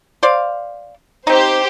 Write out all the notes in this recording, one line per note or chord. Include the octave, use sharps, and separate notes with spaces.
C5 D5 F5
C4 D#4 G4 C5